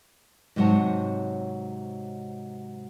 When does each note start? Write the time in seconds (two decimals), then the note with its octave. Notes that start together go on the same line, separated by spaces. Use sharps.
0.56 G#2 C3 F#3 C#5 F#5 A5